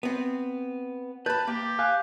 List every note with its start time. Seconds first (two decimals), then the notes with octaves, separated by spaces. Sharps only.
0.03 B3 C4
1.26 B4 A5 B5 G6
1.47 A#3 G4
1.79 F5 G#5 F#6